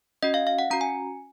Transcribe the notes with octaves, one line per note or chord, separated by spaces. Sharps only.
C#4 F#4 D#5
F5
F5
F#5
C#4 F#4 A#5
G#5